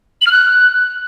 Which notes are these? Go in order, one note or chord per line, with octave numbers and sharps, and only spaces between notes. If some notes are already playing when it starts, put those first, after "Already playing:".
F#7
F6
F#6